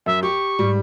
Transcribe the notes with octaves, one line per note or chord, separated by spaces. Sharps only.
F#2 E5
G4 C#6
G#2 G3